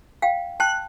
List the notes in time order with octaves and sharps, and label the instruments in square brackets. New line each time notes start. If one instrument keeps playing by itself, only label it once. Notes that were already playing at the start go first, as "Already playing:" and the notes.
[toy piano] F5 G5
[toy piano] G5 A5 [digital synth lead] F#6